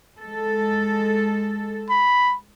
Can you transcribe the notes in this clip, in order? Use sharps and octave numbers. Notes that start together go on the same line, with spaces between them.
G#3 A4
B5